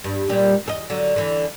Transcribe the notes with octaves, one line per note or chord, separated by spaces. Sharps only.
G2
A#2 G3
E2 A4 D#5
D3 F#3
D3 E3